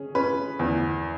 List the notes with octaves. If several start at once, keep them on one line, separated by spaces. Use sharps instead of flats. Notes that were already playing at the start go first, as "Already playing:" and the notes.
Already playing: C#4 G#4
C#4 B4
E2